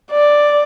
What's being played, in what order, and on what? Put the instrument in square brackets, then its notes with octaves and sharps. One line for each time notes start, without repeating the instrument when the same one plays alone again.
[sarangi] D5